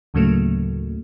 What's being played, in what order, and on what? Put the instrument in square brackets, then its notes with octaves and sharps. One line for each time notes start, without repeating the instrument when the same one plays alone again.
[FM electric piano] D2 A2 C#3 F#3 A3 A#3